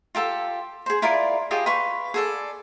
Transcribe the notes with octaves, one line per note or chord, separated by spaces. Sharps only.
F4 G4 A4 A5
G#4 C5
E4 F4 A#4 D5
F4 G4 G#4 D#5
B4 F5 C6 C#6
G#4 A4 D5